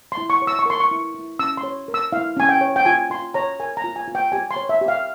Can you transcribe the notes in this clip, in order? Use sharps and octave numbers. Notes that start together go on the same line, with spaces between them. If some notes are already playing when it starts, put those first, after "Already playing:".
C6
E4
C#6
C#5
E6
C#6
A#4 C6
C#6
E4
E4
C#4 E6
C6
C#5
A#4
E6
E4 F5
C#4 G#5
G5
C#5
G5
F4 G#5
F4 C6
C#5 A#5
A#4 G#5
A#5
F4
G#5
F4
G5
G4 G#5
C6
C#5
E5
G4
F5